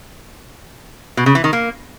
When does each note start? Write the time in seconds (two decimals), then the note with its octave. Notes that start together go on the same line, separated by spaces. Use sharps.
1.17 B2
1.26 C#3
1.35 E3
1.44 D#3
1.53 A#3